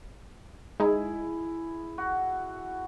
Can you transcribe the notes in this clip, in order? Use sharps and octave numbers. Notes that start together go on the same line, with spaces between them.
G#3 D#4 E4 G#4
F#4